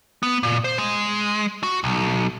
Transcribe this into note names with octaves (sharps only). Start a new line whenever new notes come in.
B3
A#2
C5
G#3
F#4
B1